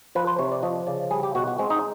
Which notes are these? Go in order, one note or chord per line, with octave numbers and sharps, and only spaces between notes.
F3 B4
C5
C3 C#5
D5
F3 D#5
C#3 D5
G3 G#4
G4
B2 F#4
F#4
G#3 C4
D#4